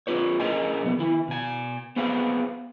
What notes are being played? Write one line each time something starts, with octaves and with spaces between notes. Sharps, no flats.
C4 F4 B4 C#5
C#4 G#4 A#4 C5 D#5 G#5
B1 F2 B3
D#3 E4
B2 G#5
B3 C4 G#4 B4 C5 F5